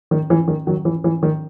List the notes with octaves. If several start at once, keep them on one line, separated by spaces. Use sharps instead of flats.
D#3
E3
D#3
D#3 F#3
E3
E3
D#3